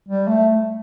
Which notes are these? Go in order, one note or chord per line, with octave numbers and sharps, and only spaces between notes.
G3
A3